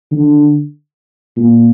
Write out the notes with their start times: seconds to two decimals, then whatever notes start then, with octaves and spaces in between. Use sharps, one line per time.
0.11 D3
1.36 A#2